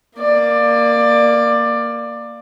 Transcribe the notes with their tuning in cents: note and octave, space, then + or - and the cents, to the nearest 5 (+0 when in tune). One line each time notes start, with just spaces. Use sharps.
A#3 -5 D5 +15